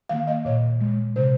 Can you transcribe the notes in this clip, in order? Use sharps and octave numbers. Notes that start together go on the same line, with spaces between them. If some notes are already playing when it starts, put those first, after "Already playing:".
D#3 A#3 F5
D#5
A#2 C#5
G#3
C3 C5